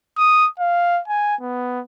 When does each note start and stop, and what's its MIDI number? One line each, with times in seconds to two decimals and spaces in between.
0.18 0.47 87
0.59 1.00 77
1.08 1.35 80
1.41 1.80 59